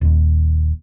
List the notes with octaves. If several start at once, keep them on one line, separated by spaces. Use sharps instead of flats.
D#1 D#2